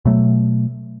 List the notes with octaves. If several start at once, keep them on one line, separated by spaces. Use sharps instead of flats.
B2 F#3 A3